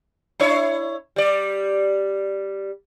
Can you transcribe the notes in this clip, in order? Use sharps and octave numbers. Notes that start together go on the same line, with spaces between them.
D4 E4 C#5
G3 D5